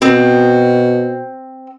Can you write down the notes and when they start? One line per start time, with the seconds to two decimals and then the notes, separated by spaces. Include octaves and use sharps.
0.02 B2 C4